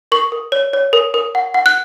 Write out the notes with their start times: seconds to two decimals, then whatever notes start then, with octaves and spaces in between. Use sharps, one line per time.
0.12 A#4 C#6
0.32 A#4
0.52 C#5
0.73 C#5
0.93 A#4
1.14 A#4
1.35 F#5
1.54 F#5
1.66 F#6